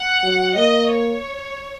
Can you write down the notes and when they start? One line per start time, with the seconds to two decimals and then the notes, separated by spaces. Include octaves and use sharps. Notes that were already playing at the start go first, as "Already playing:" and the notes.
Already playing: F#5
0.23 F#3
0.57 A#3 D#5
0.91 C#5